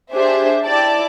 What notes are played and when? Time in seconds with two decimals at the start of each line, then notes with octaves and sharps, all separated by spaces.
0.14 D4 G4 G#4 C5 E5
0.64 E4 D5 G5 A5